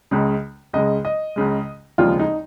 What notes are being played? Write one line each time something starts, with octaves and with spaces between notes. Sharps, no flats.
C#2 C#3 G#3
C#2 C#3 G#3 D#5
D#5
C#2 C#3 G#3
F1 D#2 C#3 F3 G#3 F4
D#4